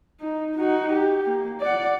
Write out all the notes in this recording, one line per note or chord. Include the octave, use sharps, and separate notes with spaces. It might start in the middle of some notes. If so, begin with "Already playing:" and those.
D#4
D#4 F#4
G4
A#3
D5 F#5